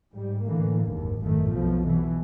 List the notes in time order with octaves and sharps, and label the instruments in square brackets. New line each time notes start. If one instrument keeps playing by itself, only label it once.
[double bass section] G#2 G3
A2 D3 E3 A#3
F#1 D#2 G#2
G#1 F#2 A2 D#3 A3
B1 F2 B2 F3
B2 E3